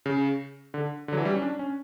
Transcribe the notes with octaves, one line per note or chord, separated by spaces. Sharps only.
C#3
D3
D3
F#3
E3
G3
C#4
D4
C#4